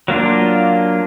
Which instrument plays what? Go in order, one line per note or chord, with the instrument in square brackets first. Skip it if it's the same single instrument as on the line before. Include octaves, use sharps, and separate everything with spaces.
[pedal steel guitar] F#3 A#3 D4 F4